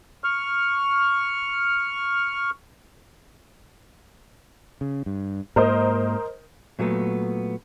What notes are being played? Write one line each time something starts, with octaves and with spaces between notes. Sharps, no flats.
C#6 F6
C#3
G2
G#2 A#3 A#4 C5 D#5
A#2 F#3 A3 B3